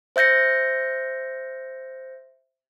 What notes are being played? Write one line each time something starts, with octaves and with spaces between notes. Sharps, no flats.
C5 E5 G6 A#6 C#7